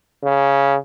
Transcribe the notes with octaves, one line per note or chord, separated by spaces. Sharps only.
C#3